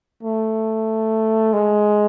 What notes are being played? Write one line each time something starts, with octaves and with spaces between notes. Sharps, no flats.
A3
G#3